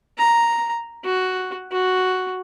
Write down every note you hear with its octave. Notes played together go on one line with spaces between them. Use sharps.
A#5
F#4
F#4